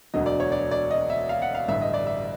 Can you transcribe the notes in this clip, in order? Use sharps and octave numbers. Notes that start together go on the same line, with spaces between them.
E1 D2 D3 F#3 D#5
D5
C#5
D5
D5
D#5
E5
F5
F#5
F5
A1 G2 D3 G3 E5
D#5
D5
E5